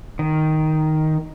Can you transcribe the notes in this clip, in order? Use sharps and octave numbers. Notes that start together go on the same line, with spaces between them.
D#3